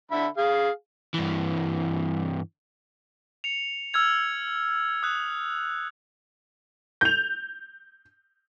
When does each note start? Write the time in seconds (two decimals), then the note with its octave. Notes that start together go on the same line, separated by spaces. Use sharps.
0.11 D3 E5 B5
0.37 G#4 F5
1.14 G2 E3
3.44 C#7 F7
3.94 E6 F6 G#6 F7
5.03 D#6 F#6
7.01 G6 F7